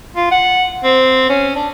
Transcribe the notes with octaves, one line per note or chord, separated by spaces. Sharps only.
F4
F#5
C4
C#4
D4